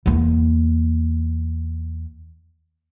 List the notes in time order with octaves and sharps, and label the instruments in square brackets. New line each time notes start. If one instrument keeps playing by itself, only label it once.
[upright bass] E2 A#3